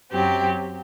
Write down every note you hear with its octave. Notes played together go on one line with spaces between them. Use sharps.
F#2 F#3 C4 G4